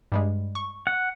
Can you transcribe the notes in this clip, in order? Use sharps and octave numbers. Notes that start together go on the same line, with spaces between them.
G2 G3 G#3
C#6
F#5